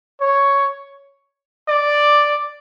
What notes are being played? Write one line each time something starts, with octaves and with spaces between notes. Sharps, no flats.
C#5
D5